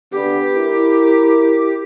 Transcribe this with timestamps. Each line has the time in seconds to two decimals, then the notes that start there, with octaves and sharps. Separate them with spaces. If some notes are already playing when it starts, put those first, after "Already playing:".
0.12 D3 B3 G4
0.55 E4 A#4